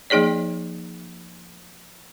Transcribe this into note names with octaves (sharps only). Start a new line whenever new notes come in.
F3 A#3 D#4 G#4 C#5 D5